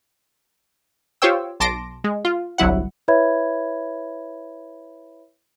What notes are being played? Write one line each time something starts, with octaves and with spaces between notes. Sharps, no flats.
F4 G4 C5 C#5 G5 E6
B1 A5 C6 D6 A#6 D7
G#3
F4
G1 C2 F#3 E4 F#5
E4 B4 C#5 E5 B5 G#6